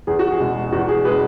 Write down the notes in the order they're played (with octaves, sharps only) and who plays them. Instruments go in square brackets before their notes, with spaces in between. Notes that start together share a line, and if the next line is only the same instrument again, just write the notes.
[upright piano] E2 G#4
F#4
G#4
B2 G#3
E2 F#4
G#4
B2 G#3 G#4 B4